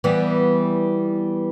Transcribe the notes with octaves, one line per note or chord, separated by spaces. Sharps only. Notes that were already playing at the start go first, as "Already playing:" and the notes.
E3 G3 B3